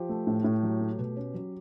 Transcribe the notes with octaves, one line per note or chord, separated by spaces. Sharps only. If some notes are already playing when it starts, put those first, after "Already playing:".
Already playing: F3 G4
A3
A2
A2
F#3
A3
B2
C#4
F#3